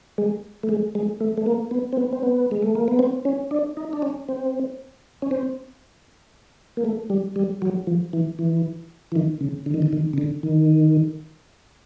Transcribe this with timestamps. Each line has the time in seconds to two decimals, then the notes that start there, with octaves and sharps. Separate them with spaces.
0.18 G#3
0.63 A3
0.69 G#3
0.95 G#3
1.21 A3
1.38 A3
1.46 A#3
1.71 B3
1.93 C4
1.97 B3
2.13 C4
2.23 B3
2.51 G#3
2.62 A3
2.75 A#3
2.88 B3
2.99 C4
3.25 C#4
3.51 D4
3.77 D#4
3.93 D4
4.02 C#4
4.29 C4
5.22 C#4
5.31 C4
6.77 A#3
6.85 A3
7.10 G3
7.36 G3
7.62 F#3
7.87 F3
8.13 E3
8.39 E3
9.12 E3
9.16 D#3
9.41 C#3
9.66 D3
9.74 D#3
9.82 D3
9.93 D#3
10.13 C#3
10.18 D3
10.43 D#3